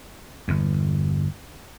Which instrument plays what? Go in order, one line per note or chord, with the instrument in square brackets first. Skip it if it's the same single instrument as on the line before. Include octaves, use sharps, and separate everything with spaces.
[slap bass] G1 E2